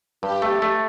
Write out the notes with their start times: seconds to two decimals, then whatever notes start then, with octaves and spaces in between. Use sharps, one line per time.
0.22 G2 G4
0.42 A3
0.62 A3